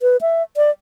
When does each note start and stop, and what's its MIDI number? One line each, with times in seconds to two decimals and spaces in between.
0.01 0.17 71
0.21 0.43 76
0.57 0.71 74